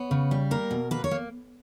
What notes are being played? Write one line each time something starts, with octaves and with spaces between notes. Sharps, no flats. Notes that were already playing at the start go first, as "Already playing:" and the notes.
Already playing: B3 C#5
C#3
G3
A#3 A#4
B2
A#3 B4
C#5
A#3